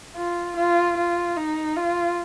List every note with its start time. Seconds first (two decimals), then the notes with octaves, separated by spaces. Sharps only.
0.17 F4
0.57 F4
0.97 F4
1.37 D#4
1.77 F4